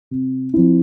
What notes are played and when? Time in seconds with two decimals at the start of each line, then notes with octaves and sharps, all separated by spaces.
0.11 C3
0.54 F3 C4 E4